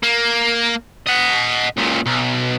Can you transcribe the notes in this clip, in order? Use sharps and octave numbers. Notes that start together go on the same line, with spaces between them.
A#3
D#5 F#5
C#2 A#2
B1